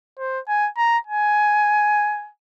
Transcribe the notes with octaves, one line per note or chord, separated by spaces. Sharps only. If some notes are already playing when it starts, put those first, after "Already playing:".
C5
G#5
A#5
G#5